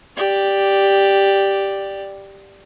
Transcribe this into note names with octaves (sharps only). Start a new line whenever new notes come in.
G4 D5